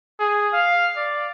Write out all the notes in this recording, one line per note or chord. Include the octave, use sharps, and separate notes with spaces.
G#4
F5
D5